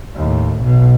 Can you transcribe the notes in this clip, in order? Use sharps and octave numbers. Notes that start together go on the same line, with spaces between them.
D#2 A2
B1 B2